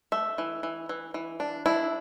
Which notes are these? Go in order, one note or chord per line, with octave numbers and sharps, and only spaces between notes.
A3 E5
E3
E3
E3
E3
D4
D4 E4